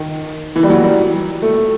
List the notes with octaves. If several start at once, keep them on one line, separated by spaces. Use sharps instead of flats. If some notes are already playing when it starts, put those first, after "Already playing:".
Already playing: D#3
E3
G3
F#3
G3
A3